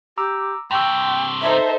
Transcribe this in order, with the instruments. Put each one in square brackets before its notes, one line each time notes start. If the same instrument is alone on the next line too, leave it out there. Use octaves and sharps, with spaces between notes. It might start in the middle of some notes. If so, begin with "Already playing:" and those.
[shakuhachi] G4 [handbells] A#5 D6 E6
[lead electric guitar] G2 C3 [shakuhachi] G5 [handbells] C6 C#6 E6
[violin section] D#4 A4 C5 [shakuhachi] E5